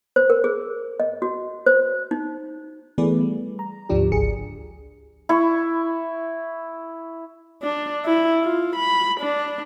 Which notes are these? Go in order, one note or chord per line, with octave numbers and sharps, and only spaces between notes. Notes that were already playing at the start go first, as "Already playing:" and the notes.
C5
A#4
G#4
D#5
F#4
C5
D#4
E3 A3 B3 G#4 B4 D5
G3
A#5
D2 G#2 F3 D4 G4
G#1 C#2 G#4 C#7
E4 C#6
D4
E4
F4
B5
D4